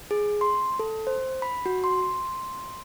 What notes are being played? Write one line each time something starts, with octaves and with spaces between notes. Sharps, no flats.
G#4
C6
A4
C5
B5
F#4
C6